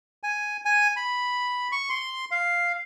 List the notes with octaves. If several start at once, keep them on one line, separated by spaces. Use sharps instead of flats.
G#5
G#5
B5
C#6
C6
F5